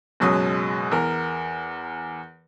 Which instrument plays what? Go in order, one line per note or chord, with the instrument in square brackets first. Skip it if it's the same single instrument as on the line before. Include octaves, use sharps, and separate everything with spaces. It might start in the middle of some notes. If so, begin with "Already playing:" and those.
[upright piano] F#1 F#2 B2 F#3 G#3 D#6
E2 A#4